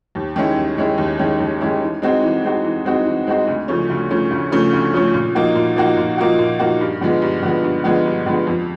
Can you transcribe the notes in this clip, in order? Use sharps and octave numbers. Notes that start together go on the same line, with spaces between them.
D#2
D#3 G#3 C#4 E4
D#2
D#3 G#3 C#4 E4
D#2
D#3 G#3 C#4 E4
D#2
D#3 G#3 C#4 E4
E3
G#3 C4 D#4 F#4
E3
G#3 C4 D#4 F#4
E3
G#3 C4 D#4 F#4
E3
G#3 C4 D#4 F#4
D2
C#3 F3 A3 C#4
D2
C#3 F3 A3 C#4
D2
C#3 F3 A3 C#4
D2
C#3 F3 A3 C#4
A#2
F3 A#3 D#4 F#4
A#2
F3 A#3 D#4 F#4
A#2
F3 A#3 D#4 F#4
A#2
F3 A#3 D#4 F#4
G2
D3 F3 G#3 B3
G2
D3 F3 G#3 B3
G2
D3 F3 G#3 B3
G2
D3 F3 G#3 B3
F2